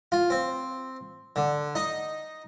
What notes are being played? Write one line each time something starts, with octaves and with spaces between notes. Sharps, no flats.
F4
C4
D3
D#4